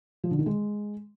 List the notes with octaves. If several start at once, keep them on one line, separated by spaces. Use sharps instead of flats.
F3
D3
D#3
G#3